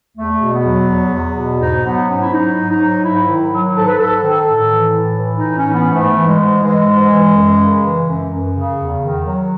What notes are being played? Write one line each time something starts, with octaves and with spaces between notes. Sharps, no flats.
E2 A3
B2
B3
F#3
E2
E2
B2
G#2 D#4
F#3 B3
G#2 C#4
E4
F#3 D#4
G#2
D#4
F#3
G#2 E4
D#3
F#3
G#2 A4
B4
G#2 A4
D#3
A2
E3
A2
E3
D#4
A2
C#4
E3
B3
G#2 A3
E3
G#3
G#2
E3 G#3
G#2
E3
F#2
C#3
E3
F#2
F#2
C#3
E2
D#3
F#3